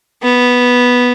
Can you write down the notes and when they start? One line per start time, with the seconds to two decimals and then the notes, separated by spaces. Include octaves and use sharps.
0.23 B3